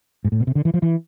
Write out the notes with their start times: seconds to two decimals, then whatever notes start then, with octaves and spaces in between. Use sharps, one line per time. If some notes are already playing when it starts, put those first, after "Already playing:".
0.25 G#2
0.32 A2
0.40 B2
0.47 C3
0.55 D3
0.65 E3
0.74 F3
0.82 E3